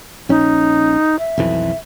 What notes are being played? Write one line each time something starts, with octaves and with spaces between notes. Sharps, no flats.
A#1 C#4 D#4
E5
B1 F2 E3